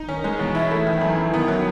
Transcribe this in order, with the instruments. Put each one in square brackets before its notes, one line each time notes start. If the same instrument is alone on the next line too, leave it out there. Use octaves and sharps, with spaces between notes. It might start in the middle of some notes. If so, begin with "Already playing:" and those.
Already playing: [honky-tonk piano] D#4
[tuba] D#3 [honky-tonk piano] C#4
[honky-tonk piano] G#3
[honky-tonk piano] B2 [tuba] E3
[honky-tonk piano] E4
A3
D#3
F#2
F#2
[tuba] D#3 [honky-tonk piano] B3
[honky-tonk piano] F#3